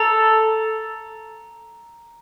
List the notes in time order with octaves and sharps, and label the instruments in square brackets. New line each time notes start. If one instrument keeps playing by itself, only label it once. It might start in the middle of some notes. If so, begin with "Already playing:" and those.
Already playing: [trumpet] A4 [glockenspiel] A#5